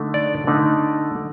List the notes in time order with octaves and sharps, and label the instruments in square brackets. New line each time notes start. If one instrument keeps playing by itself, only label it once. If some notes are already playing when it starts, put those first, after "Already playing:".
Already playing: [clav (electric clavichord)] D3 A3 D#4
D5
D3 A3 D#4